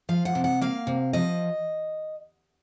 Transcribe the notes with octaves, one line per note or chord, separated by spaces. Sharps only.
F3 F5
F#5
C3
F#5
A#3 F5
C3
F3 D#5